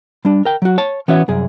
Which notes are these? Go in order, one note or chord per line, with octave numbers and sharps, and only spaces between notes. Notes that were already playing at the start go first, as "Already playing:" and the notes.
G3 D4
A#4 G5
F#3 F#4
C#5 A5
E3 B3 C#4 F#4 C#5 E5
C2 F#2 G#4